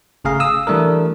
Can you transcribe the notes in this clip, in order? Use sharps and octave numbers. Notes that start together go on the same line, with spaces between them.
G#1 C#3 A3 G#4 F5 A#5
D#6 E6
E3 G3 A3 D4 A#4